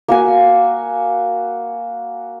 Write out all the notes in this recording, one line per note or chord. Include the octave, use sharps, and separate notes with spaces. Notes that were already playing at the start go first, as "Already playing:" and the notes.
A#3 F#4 G#5